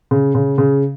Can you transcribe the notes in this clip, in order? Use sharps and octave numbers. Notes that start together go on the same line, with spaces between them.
C#3
C#3
C#3